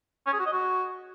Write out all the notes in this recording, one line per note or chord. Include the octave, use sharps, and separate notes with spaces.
C#4
G#4
F#4
D#5
F#4